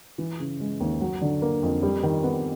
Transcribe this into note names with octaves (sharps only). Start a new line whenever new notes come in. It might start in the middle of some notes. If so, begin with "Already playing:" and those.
E3
C#3
G#3
D#2
F#3
D3
A#3
F2
G3
D#3
B3